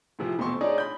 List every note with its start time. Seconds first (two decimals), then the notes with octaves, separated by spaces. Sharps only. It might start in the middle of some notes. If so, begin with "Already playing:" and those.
0.19 A2 C3 E3 F3
0.38 D#1 B2 A3 C4 C6 C#6
0.61 D4 D#4 G#4 C#5 D5
0.78 B5 G6